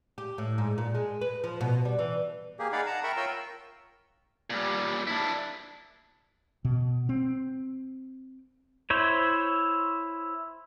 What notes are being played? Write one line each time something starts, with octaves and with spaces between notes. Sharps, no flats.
G4
A2
G#2
A#2
G#3
B4
F3
B2
G3
E3
A#3 G4 G#4
D#4 G#4 D5 F5 F#5 B5
F#5 A5 A#5
A#4 E5 G5 B5 C#6
F4 A#4 C#5 G5 C6 E6
A#2 G3
D4 E4
B2
C4
E4 C5 C#5